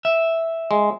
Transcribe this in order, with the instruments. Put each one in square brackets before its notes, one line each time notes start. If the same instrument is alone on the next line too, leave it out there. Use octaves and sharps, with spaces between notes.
[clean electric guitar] E5
[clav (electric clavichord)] G#3